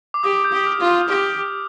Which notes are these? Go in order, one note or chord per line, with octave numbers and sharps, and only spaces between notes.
D6
G4 D#6
G6
G4 D#6
F6
F4
D#6
F6
G4 D#6